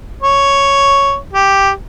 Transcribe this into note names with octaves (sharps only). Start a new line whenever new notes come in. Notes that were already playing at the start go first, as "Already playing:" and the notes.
C#5
G4